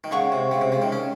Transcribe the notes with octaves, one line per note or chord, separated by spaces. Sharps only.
D#3
C#3 C#5 F#5 C#6
C3
C#3
C3
C#3
D#3
C#4